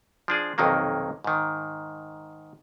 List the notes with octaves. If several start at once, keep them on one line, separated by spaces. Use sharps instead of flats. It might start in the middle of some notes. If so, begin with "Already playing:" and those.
F3 D4 G#4
B1 F2 C3 D#3 F#3 A#3
G#2 D#3